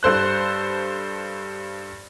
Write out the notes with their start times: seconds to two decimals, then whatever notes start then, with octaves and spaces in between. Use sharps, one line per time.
0.03 G2 A4 C5 F#6